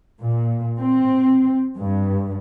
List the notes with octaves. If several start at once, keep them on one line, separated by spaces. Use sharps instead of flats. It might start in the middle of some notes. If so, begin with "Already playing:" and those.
A#2
C4
G2